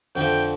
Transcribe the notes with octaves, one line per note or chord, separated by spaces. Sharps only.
F2 D3 F3 G5